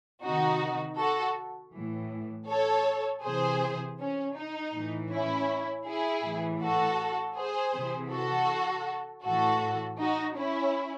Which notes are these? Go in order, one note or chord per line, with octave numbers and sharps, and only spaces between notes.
C3 D#3 D#4 F#4
F#4 A4
A2 E3
A4 C#5
C3 E3 G#4 C5
C#4
D#4
A2 E3
C#4 E4
E4 G#4
A2 E3
F#4 A4
G#4 C5
C3 E3
F#4 A4
A2 E3 F#4 A4
D#4 F#4
C#4 E4